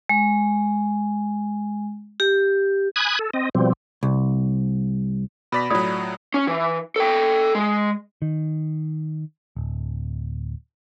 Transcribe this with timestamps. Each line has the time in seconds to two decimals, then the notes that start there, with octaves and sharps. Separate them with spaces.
0.09 G#3
2.20 G4
2.96 G#5 B5 D#6 F#6 G#6
3.19 A4
3.34 C4 D#5
3.55 B2 F3 G3 C4
4.03 C2
5.52 B2 D5 B5 B6
5.70 A2 F#3 F4 D5 D#6
6.34 C#4
6.47 E3
6.96 A4 G5
7.55 G#3
8.22 D#3
9.56 D1